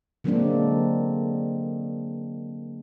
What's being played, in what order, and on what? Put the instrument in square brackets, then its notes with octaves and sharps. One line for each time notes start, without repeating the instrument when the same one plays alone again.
[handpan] D3 F#3 G#3 A#3 C4 D4